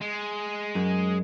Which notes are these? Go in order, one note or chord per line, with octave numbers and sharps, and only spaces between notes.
G#3
F#2